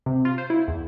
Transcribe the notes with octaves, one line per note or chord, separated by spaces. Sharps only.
C3
F4
C5
E4
E2